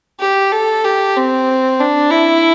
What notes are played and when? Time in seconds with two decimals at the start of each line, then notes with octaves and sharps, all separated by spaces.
0.20 G4
0.52 A4
0.85 G4
1.16 C4
1.80 D4
2.11 E4